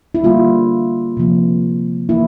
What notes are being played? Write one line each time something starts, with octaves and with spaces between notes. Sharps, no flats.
E4
D3 G3 A#3 F4
C3 F3 A#3
E3 A#3 E4